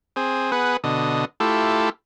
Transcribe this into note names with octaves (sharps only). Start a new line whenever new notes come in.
C4 G#4
B3 G#4 B4 F#5
B2 D3 D#5
A3 E4 F4 G4 A4